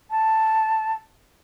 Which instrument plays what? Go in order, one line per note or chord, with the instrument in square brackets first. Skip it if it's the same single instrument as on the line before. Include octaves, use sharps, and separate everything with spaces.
[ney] A5